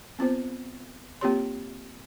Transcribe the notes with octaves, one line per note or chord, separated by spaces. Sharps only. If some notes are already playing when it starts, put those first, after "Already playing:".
B3 C4 F4 C5
A#3 C4 F4 G4 C#5 C6